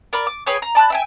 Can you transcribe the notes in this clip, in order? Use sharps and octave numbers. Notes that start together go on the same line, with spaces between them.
A#4 D5 B5 F6
D6
G#4 B4 C#5 G5
A#5
D5 A5 B5 F#6
E5 G5 G#5